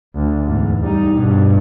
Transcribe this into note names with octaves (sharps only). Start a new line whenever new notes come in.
D2
E2 G#2
G3 D#4
G2 B2